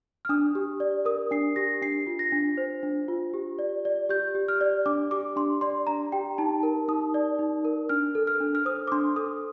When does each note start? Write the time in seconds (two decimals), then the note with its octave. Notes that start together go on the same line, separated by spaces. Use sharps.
0.25 F6
0.29 D4 D#6
0.55 G4
0.80 D5
1.05 A#4 D#6
1.31 D4 C7
1.56 G4 A#6
1.82 D4 C7
2.07 F4
2.19 A#6
2.32 D4
2.57 C5
2.83 D4
3.08 F4
3.34 G4
3.59 D5
3.85 D5
4.09 G4 G6
4.35 G4
4.48 F6
4.61 D5
4.86 D4 D6
5.11 G4 D6
5.36 D4 C6
5.61 D5 C6
5.87 D4 A#5
6.12 G4 G5
6.38 D#4 A5
6.63 A#4
6.88 D#4 D#6
7.14 D5
7.39 D#4
7.65 A#4
7.89 D4 F6
8.15 A4
8.27 F6
8.40 D4
8.55 F6
8.65 C5 D#6
8.88 D6
8.92 D4 C6
9.16 A4 D#6